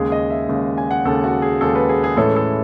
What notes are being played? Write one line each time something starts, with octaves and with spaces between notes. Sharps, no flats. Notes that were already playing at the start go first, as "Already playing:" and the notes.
Already playing: D#2 C#3 G#3 G#4
D#5
E5
D#2 C#3 G#3
G#5
F#5
D#2 C#3 G#3 A4
F#4
G#4
D#2 C#3 G#3 A4
B4
G#4
G#4
A2 E3 G#3 C#4 A4
A4